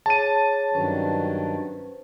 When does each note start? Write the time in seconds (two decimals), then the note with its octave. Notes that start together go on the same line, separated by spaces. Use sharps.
0.06 G#4 C#5 A5 D6 D#7
0.74 G2 D#3 F#3 C#4 B4 C5